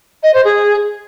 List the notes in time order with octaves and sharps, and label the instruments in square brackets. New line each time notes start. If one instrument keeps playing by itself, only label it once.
[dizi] D#5
C5
G#4